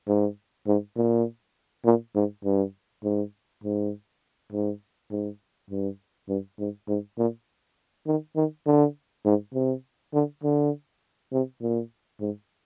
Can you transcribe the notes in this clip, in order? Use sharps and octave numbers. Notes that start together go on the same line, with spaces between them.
G#2
G#2
A#2
A#2
G#2
G2
G#2
G#2
G#2
G#2
G2
G2
G#2
G#2
A#2
D#3
D#3
D3
G#2
C3
D3
D3
C3
A#2
G#2